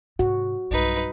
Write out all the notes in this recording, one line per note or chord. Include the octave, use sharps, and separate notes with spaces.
G#2 C3 F#4
B1 G2 D#4 B4